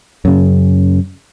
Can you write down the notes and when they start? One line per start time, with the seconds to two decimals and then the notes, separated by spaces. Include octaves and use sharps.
0.25 F#2 C#3